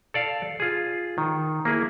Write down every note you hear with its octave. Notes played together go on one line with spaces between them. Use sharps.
A4 D5 F5
F4 G#4
D#3
A#3 E4 G#4